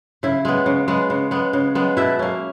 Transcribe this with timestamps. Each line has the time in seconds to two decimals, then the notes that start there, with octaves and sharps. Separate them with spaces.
0.23 C#3 E4
0.45 G#3 B3
0.66 C#3
0.88 G#3 B3
1.10 C#3
1.31 G#3 B3
1.53 C#3
1.75 G#3 B3
1.97 B2 E4 E5
2.19 A#3 C#4